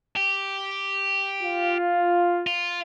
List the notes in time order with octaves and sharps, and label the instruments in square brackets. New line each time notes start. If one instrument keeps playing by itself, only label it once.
[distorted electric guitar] G4
[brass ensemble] F4
[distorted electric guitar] F4